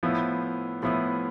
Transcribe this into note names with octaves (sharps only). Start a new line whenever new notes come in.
A2 F3 B3 E4
A2 F3 B3 E4